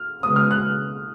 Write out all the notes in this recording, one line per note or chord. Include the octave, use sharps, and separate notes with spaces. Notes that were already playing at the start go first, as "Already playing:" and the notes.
Already playing: F6
C#3 G#3 B3 D#6
F6
F#6